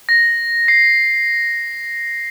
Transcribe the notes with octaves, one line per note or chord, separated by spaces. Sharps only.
A#6
C7